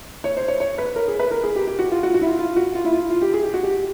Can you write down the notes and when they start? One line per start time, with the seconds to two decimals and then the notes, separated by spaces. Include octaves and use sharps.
0.24 C#5
0.36 C5
0.48 C#5
0.60 C#5
0.78 B4
0.96 A#4
1.08 G#4
1.19 B4
1.31 A#4
1.43 G#4
1.55 G4
1.67 G4
1.79 F#4
1.91 F4
2.03 F#4
2.14 F#4
2.21 E4
2.27 F4
2.39 F4
2.56 F#4
2.75 F4
2.84 E4
2.92 F4
3.10 F4
3.22 G4
3.34 G#4
3.43 G4
3.54 F#4
3.63 G4